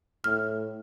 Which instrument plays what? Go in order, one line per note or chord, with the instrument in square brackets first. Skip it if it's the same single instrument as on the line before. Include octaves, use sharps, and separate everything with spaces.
[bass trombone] A2 [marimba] F6